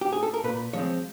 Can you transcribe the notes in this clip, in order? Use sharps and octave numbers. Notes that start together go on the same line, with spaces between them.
G4
G#4
A4
A#4
A#2 B4
F3 G#3 C4 C#5